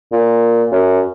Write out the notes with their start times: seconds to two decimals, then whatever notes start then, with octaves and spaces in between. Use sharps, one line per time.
0.12 A#2
0.72 F#2